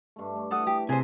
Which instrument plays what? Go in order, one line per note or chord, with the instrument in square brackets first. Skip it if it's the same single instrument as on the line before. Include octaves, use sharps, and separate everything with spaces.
[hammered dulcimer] G2 A3
A3
[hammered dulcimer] E3 [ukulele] A4 F#5 [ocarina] D#6
[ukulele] G4
[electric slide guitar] C3 [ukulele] G#4 C5 [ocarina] G#5